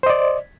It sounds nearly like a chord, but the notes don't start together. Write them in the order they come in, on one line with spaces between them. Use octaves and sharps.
C5 D#5 D5